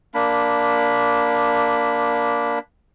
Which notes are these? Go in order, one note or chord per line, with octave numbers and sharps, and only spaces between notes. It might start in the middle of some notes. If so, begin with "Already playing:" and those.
A#3 D4 B5